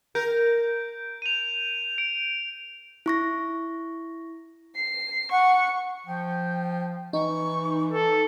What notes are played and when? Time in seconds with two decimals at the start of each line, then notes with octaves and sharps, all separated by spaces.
0.15 A#4 G6 D7
1.22 D#7 F7
1.98 D7
3.06 E4 C#6 A#6
4.75 C7
5.31 F#5 C#6
6.07 F3 G5
7.13 E3 D#4 C#6
7.91 A4